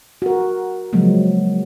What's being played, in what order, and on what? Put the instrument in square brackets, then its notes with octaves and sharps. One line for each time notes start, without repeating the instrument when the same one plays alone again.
[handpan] F#4 A#4
C#3 F3 F#3 G#3 A#3